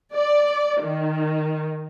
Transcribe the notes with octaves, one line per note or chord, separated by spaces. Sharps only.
D5
D#3